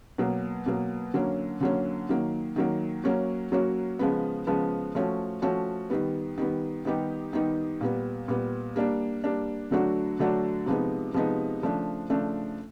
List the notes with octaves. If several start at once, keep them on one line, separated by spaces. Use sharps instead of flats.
B2 F#3 A#3
B2 F#3 A#3
D3 F#3 A#3 C#4
D3 F#3 A#3 C#4
D#3 F#3 A#3
D#3 F#3 A#3
F#3 A#3 C#4 F#4
F#3 A#3 C#4 F#4
C#3 F3 G#3 B3
C#3 F3 G#3 B3
F3 A3 C#4 F#4
F3 A3 C#4 F#4
D#3 G3 B3
D#3 G3 B3
D#3 G3 B3 D#4 G4
D#3 G3 B3 D#4 G4
A#2 G3 B3
A#2 G3 B3
G3 A#3 D4
G3 A#3 D4
D3 F#3 A3 D4 F#4
D3 F#3 A3 D4 F#4
C3 F3 G#3 B3 D#4
C3 F3 G#3 B3 D#4
C#3 F3 A3 D4
C#3 F3 A3 D4